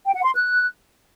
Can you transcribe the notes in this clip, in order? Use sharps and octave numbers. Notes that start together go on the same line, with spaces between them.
G5
F#5
C6
F#6